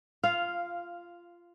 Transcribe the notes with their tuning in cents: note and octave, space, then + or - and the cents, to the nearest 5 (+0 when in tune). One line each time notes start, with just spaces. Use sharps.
F4 -15 F5 +0